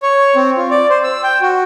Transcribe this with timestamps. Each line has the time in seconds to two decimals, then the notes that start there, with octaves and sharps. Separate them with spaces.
0.03 C#5
0.36 C4
0.57 F4
0.71 D5
0.90 C5
1.04 E6
1.23 G5
1.41 F#4